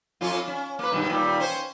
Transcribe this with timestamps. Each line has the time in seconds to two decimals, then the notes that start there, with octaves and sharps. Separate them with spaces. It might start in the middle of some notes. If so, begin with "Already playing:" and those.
0.21 F2 C#4 F4
0.48 C#4
0.79 A#3 B4
0.92 G2 B2 D#3
1.09 D#2 A#2 G3
1.40 C#4 C5